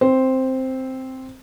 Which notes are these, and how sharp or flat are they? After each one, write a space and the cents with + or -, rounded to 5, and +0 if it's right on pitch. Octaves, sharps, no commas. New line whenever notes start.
C4 +0 C5 +0